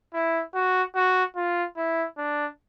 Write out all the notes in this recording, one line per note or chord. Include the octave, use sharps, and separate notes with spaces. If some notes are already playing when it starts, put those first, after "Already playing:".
E4
F#4
F#4
F4
E4
D4